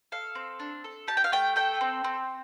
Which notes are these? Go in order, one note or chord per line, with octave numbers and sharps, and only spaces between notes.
A4 F5
C4
D4
A4
G4 A5
G5
F5
A3 G5
A4 G5
C4
C4